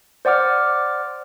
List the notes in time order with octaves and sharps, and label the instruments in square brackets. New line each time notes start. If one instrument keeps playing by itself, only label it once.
[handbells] C5 D5 F#5 D6 F6